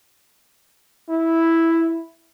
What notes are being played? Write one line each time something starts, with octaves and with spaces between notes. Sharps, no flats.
E4